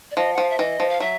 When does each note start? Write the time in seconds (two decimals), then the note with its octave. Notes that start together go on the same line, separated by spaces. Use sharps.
0.11 D5
0.16 F3 D#5
0.33 F#5
0.38 F3 F5
0.50 E5
0.58 E3 D#5
0.80 F3
0.89 F5
1.00 F#3 E5